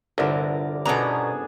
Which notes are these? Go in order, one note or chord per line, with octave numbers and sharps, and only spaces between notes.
G1 C2 D3 A#4 D5 A#5
B2 B3 C#4 D4 G#4 A4 A#5